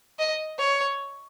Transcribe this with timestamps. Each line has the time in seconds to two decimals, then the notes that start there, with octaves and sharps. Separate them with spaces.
0.19 D#5
0.59 C#5